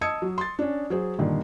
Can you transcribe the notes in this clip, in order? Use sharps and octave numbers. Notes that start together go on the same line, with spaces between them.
D#5 A5 D#6 E6 G#6 C#7
F#3
C6 A6
C#4 D4
F#3 G#4 C5
G2 A#2 D3 D#3